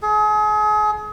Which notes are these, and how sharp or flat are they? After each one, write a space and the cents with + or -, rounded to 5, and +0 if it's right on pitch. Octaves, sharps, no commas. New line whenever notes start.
G#4 +35